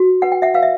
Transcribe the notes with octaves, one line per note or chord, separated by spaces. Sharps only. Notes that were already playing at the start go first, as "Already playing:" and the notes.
Already playing: F#4
B4 F#5
G5
E5 F#5
B4 F5
E5